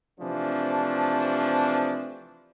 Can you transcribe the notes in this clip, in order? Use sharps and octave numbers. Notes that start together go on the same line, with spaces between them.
C3 E3 F3 A3 C4 D4